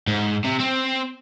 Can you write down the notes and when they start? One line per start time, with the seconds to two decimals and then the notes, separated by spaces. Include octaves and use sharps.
0.07 G#2
0.44 C3
0.60 C4